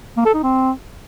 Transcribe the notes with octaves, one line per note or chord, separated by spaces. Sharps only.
A#3
A4
D#4
C4